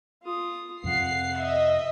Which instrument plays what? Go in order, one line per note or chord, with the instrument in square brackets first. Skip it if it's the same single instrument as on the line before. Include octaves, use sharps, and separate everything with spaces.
[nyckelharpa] F4 D#6
[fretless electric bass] F2 C3 F3 [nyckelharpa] F5 F#5 [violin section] C7
[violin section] D#5 E5